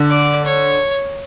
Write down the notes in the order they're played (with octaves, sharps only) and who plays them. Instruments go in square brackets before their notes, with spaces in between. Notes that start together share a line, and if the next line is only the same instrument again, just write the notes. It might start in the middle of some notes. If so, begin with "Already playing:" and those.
Already playing: [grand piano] D3
[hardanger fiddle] D5
C#5